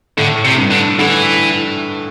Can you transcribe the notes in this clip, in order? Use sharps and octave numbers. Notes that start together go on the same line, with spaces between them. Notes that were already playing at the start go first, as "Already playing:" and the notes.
A2 D3
C3
G2
D3
D3 E3